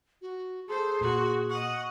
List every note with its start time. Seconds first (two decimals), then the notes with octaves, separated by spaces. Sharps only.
0.22 F#4
0.69 G#4 A4 C5 C6
1.01 A#2 F#4
1.49 D#5 F#5 C#6